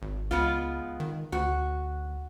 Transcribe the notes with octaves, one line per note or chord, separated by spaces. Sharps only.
G#1
C#2 G#3 B3 F4
D#3
D2 F#4